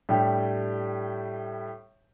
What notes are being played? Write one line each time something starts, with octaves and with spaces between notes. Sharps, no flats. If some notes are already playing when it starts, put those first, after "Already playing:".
A2 G3 D4 G4